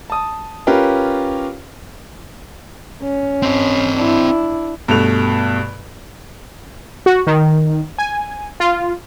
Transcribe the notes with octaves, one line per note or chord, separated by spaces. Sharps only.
A5 D#6
C#4 F4 G4 A#4 B4
C#4
C4 D#5
D4 E4
G2 B2 A3 F7
F#4
D#3
G#5
F4